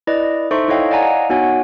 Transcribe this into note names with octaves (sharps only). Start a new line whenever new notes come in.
E4 B4 D5 D#5
D#4 A4 C5 E5 C6 C#6
E4 A4 C#5 D#5 F5 G5
D5 D#5 F5 F#5 G#5 A#5
B3 D#4 F#4 C#5 F#5 G#5